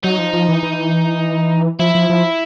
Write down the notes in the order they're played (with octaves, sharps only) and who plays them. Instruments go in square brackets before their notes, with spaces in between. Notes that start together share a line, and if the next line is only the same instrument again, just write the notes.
[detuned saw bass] F#3 [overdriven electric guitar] D#4
[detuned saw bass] F3
F3
E3
E3
[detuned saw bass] F3 [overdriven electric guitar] E4
[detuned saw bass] F3
F3